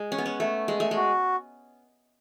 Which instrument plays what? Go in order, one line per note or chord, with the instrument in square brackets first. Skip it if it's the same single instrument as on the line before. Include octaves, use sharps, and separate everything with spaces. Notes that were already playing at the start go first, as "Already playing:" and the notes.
Already playing: [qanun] G#3
C#4
B3
C#4
A3
G#3
A3
[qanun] G#3 [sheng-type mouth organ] F#4